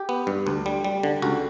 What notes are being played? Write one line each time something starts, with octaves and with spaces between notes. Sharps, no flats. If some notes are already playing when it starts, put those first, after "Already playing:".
Already playing: G4
B3
G2
D2
G3
G3
D3
C#2 F#4